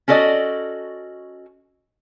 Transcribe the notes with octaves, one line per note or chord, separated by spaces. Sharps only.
C#4 F#4 A4 D5 D#5